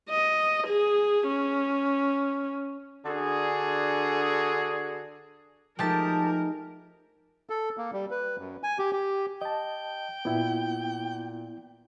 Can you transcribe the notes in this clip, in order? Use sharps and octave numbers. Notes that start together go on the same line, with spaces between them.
D#5
G#4
C#4
D3 D4 F#4 G#4
F3 G#3 A3 D#4 G4 A#4 A5
A4
A#3
G3
B4
F#2
G#5
G4
G4
D#5 G5 A5
A#2 B3 E4